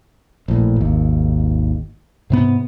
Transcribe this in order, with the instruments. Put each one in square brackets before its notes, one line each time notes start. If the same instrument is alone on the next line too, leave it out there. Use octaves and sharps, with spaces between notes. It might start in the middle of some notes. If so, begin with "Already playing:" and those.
[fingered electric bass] A#1 A2
G#1 D#2
G#2 C3 B3